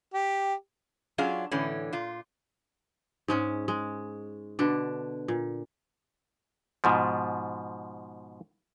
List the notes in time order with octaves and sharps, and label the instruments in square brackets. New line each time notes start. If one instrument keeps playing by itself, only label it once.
[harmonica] G4
[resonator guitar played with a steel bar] F#3 C#4 D4 F4 G#4 F5
A2 D3 E3 C#4
A#2 F4
[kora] G#2 G#3 C#4
G#3
B2 D3 D4
A#2
[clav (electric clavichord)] G#2 B2 F3